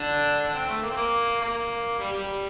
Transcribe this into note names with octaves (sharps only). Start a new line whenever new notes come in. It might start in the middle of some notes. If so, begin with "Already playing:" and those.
Already playing: D3 D4
D4
C4
A3
A#3
C4
A#3
A#3
G3
G3